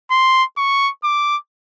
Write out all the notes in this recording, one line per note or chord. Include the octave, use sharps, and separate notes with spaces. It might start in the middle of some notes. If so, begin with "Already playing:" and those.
C6
C#6
D6